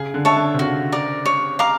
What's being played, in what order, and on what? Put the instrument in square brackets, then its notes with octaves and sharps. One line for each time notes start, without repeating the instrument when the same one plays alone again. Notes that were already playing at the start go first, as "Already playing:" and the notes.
Already playing: [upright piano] C#3 [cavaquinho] G#4
[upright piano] D3
[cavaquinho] C#5 E5 A5
[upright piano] D3
C3
[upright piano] C#3 [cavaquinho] F#4
[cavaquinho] A#4 D5
C#5
F5 A#5 D6